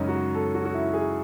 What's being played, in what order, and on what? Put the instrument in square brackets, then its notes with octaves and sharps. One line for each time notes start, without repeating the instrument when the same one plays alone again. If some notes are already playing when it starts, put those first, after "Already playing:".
Already playing: [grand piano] F#2 C#3 G#3 C#4 D#4
F#4
A4
F#4
F#4
E4
G#4